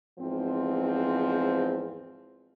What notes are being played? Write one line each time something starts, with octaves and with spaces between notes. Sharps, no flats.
E2 G#2 F3 C4